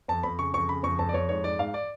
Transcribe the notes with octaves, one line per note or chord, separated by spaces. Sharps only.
F2 A5
F2 B5
C#3 C#6
F2 C#6
C#3 B5
F2 C#6
F2 A5
D5
F2 C#5
G#2 C#5
G#2 D5
G#2 F5
D5